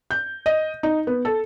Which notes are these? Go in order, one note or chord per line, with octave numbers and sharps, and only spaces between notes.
G6
D#5
D#4
B3
A4